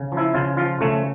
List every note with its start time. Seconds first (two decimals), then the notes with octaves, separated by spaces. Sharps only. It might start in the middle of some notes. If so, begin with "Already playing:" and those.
Already playing: C#3
0.12 F3
0.17 E4
0.35 C#3 F4
0.57 F3 F4
0.81 C#3 A3